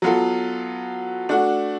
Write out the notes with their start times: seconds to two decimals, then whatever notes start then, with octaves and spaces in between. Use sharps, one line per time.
0.02 F#3 B3 F4 A4
1.29 A3 D4 F#4